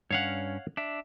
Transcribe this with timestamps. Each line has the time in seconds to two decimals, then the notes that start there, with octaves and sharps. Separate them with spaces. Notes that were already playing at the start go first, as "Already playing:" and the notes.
0.11 G2 C#4 C#5 F5 F#5
0.77 D4 E5